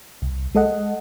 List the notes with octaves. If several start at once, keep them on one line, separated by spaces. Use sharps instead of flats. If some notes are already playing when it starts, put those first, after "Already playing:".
C2
G#3 A4 D#5 F#5